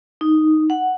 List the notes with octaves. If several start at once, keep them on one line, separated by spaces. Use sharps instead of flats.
D#4
F#5